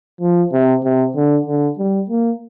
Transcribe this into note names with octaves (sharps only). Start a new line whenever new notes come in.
F3
C3
C3
D3
D3
G3
A#3